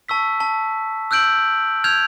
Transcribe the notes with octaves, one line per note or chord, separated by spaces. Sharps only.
A5 C#6 E6 B6
A5
E6 F#6 G6 D7 F#7
F6 G6 G#6 F7